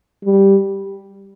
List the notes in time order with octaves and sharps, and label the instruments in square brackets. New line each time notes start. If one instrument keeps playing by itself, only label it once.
[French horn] G3